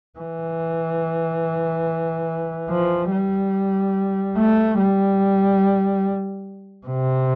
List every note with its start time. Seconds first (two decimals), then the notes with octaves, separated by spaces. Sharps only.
0.19 E3
2.70 F3
3.12 G3
4.37 A3
4.79 G3
6.87 C3